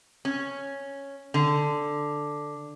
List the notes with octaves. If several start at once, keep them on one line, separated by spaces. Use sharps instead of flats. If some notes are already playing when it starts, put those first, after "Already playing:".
C#4
D3